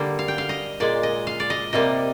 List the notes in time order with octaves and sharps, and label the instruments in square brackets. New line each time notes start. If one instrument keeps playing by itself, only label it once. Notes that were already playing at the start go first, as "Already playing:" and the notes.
Already playing: [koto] D3 G3 A#3
F5
G5
F5
D#5
A#2 G#3 D5
D#5
F5
D5
D#5
C3 G3 A#3 D#5